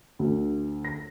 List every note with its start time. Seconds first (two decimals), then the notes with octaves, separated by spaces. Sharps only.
0.19 D2
0.85 A#6